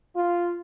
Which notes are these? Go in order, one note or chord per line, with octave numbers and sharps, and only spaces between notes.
F4